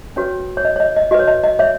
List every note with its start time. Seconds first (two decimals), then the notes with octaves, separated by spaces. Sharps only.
0.16 C#4 F#4 B4 C#5
0.57 C#5
0.65 D#5
0.76 C#5
0.80 D#5
0.96 D#5
1.11 F#4 B4 D#5
1.19 C#5
1.27 D#5
1.44 D#5
1.59 C#5 E5